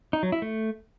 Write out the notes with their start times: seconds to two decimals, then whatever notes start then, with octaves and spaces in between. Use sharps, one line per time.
0.13 D#4
0.23 F#3
0.32 E4
0.42 A3